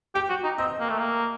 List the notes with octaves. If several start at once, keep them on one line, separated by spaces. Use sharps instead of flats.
G4 G5
F#4
D#4
C4 D#5
A#3
A3
A#3